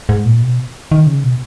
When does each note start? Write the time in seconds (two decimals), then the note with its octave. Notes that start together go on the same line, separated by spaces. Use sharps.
0.09 G#2
0.25 A#2
0.42 B2
0.92 D#3
1.07 C#3
1.24 B2